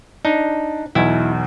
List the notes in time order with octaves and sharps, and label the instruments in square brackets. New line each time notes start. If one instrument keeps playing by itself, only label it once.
[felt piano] D4 [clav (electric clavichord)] D#4
[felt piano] B1 E2 G#6 [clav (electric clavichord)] E4